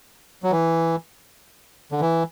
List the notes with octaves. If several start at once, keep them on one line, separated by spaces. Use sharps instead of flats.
F#3
E3
D3
E3